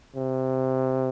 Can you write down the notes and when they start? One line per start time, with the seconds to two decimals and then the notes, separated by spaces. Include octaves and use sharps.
0.16 C3